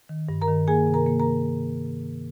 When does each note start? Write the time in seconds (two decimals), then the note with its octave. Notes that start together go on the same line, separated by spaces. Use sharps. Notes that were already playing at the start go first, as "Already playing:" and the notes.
0.09 D#3
0.29 G2
0.41 A#4 A#5
0.48 D#3
0.67 A#3 G#4 G#5
0.87 C3
0.94 A#4 A#5
1.06 A#3
1.20 A#4 A#5